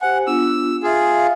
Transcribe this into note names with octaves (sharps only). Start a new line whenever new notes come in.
G4 C5 F#5 G#5
B3 D4 F4 E6
F4 G#4 E5 F5